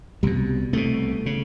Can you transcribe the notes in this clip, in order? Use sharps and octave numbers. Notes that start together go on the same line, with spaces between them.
C2 B2 G3
C2 B2 A3
C#3